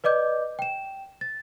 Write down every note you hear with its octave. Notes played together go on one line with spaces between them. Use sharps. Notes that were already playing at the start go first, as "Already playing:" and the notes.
B4 D5 D#5 D6 G6
G5 E7
A6